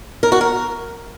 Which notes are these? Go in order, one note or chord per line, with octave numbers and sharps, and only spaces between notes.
A#4
F#4
A#4